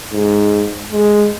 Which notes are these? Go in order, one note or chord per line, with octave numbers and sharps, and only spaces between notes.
G#2
G#3